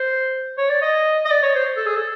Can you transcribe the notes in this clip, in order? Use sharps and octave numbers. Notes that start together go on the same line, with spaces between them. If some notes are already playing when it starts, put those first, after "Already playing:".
Already playing: C5
C#5
D5
D#5
D#5
D5
C#5
C5
A4
G#4
A4